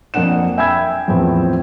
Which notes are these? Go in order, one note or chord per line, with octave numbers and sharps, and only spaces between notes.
F2 A#3 D4 F#5 E7
E5 G5 G#5 B5 E6 G#6
E2 A2 F3 C4